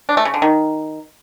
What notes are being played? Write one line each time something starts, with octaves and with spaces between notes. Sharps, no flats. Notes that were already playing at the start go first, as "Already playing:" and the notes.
D4
A3
C#3
D3
D#3